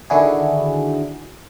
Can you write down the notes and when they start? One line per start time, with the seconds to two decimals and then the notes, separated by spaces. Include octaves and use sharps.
0.10 D3 D#3 D4 E4 F#4 G#4